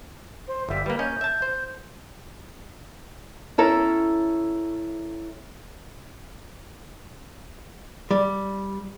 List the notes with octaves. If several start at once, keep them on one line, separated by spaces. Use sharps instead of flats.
C5
G1 G3 E5
G3 A#3 B4
A#3 C#4 D#5 G6
E5 A5
C5
C#4 E4 A4 A#5
G3